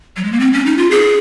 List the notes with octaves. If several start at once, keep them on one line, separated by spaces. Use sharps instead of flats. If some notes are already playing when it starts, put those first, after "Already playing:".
F#3
G#3
A#3
C4
C#4
D#4
F4
G#4